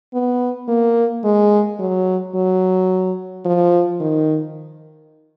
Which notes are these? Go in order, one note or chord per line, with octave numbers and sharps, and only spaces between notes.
B3
A#3
G#3
F#3
F#3
F3
D#3